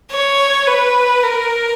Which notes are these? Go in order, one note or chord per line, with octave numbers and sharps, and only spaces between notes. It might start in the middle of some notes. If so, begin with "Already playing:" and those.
C#5
B4
A#4